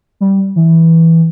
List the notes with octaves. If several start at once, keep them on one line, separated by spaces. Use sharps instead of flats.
G3
E3